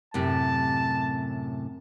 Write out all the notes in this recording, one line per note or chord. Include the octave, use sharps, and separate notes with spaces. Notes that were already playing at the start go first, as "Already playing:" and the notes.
F#2 A2 C3 A5